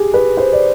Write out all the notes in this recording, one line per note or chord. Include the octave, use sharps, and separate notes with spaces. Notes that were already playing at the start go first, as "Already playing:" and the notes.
Already playing: G4 G#4
B4
C5
D5